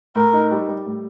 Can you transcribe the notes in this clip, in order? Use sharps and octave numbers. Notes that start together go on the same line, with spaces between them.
A2 A#4
D#4
G3
G3
A2